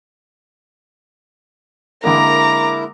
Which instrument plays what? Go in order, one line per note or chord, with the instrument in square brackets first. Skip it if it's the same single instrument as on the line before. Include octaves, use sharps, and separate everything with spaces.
[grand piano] D3 G#3 A#3 [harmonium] E4 A#4 [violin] A#5 D6